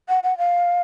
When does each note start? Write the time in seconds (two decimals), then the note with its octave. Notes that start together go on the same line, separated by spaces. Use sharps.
0.09 F#5
0.24 F#5
0.38 F5